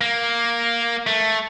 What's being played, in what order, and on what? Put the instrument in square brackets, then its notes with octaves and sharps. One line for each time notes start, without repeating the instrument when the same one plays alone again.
[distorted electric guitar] A#3
A3